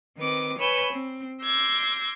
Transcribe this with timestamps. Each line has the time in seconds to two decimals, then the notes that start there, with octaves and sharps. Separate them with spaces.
0.18 D#3 C4 B4 D6
0.58 B4 C#5 G#5 B5 E6 G6
0.92 C4
1.43 C6 D6 E6 G6 G#6 A#6